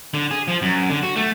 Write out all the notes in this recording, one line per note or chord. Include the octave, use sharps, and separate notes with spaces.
D3
G#4
F3
F#2
D3
F#4
A3